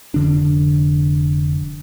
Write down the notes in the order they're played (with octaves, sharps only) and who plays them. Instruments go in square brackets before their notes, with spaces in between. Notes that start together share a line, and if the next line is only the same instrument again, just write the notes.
[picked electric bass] F1 D3 D4